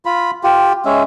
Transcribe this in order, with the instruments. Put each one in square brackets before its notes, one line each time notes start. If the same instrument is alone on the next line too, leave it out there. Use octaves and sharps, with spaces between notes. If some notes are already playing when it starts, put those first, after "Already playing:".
[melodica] F4 B5
F4 G4
G#3 C#4 E5